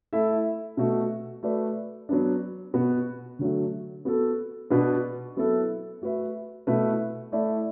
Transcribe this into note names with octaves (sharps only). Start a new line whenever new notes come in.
A3 E4 A4 E5
B2 A3 F#4
A3 F#4 B4 D5
F#3 B3 D4
B2 B3 F#4
D3 F#3 A3 F#4
B3 F#4 A4
B2 B3 D4 B4
F#3 B3 E4 A4
A3 F#4 B4 E5
B2 A3 E4 B4
A3 E4 D5